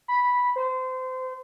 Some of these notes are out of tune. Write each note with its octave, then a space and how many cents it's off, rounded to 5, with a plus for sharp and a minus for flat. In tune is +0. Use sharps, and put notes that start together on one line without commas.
B5 -5
C5 -25